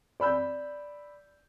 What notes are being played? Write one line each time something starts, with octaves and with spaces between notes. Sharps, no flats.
D5 B5 E6 G6